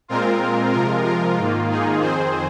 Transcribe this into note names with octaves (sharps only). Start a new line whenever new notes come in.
A#2 G#3 C4 F4 A#4
C3 F3 G#3 F4 A#4
F4 A#4
G#2 D#3 A#3 F4
D#4 G#4
F2 D#3 C4 G#4 C5